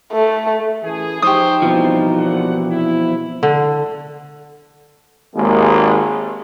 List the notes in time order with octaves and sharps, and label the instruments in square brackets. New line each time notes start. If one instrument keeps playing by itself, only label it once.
[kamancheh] A3
[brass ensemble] A1 G#4 [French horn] E3
[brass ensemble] F3 C5 [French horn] D#4 [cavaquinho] G4 C#6 D#6
[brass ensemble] C2 C5 [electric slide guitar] B2 E3 F3
[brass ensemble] D#2 D4 F#5
[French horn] C3 [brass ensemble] E4
[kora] D3
[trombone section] G#1 D#2 G#3 A#3